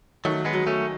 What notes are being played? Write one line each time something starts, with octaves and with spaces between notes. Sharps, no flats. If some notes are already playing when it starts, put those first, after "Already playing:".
D#3 F#3 A3
G#3 B3
F#3
A3 C#4